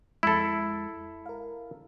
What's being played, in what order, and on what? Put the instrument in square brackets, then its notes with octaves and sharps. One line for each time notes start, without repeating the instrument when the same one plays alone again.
[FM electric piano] F2 G#3 [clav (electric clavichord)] E4 A4
[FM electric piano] A#4 F5